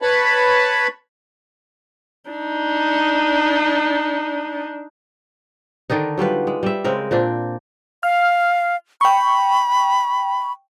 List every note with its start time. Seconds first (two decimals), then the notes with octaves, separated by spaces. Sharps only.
0.02 B4 C#5 A5 B5
2.30 D4 D#4
5.90 D3 D#3 D4 D#4
6.18 F#3 G3 F4 B4
6.47 G#3
6.63 G3 E5
6.84 C#3 G#3 C4 A#4
7.11 A#2 C4 D4
8.03 F5 F6
9.01 G5 B5 C#6